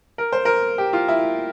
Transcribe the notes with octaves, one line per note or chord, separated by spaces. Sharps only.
A#4
C5
A#4
G4
F4
E4